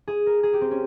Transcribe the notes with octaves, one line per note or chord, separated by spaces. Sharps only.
G#4
A#4
G#4
G4
C4
C#4